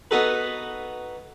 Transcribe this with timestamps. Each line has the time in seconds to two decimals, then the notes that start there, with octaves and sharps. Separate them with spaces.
0.11 B3 D#4 F#4 A4 B4